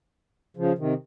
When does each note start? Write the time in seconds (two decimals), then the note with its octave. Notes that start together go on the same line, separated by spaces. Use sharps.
0.57 C#3 F3
0.78 C3 D#3